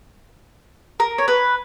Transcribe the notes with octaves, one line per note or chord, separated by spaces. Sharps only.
A#4
C#5
B4